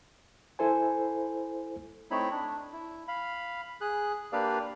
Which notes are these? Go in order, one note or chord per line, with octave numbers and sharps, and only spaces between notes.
E4 A4 C5 G#5
A3 C4 D#4 E4 C#5 B5
D4
E4
F5 B5
G#4 F#6
A#3 D4 G4 B4 D5 F5